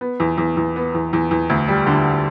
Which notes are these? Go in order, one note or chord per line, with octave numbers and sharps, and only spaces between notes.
B3
E2
E2
E2
B3
E2
E2
E2
D2
G3
D3